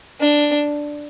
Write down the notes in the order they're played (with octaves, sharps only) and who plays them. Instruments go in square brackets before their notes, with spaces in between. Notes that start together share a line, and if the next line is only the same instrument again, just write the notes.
[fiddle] D4